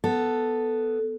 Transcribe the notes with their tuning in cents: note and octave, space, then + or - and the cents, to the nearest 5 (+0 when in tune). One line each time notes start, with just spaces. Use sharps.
B3 +0 A4 +0